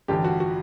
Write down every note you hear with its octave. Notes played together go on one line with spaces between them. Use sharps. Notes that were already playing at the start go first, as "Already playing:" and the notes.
A1 G2 D3 G4
F#4
F#4